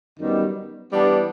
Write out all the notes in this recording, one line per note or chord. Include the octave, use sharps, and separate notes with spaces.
F#2 D#3 G3 B3
E3 G3 B3 D4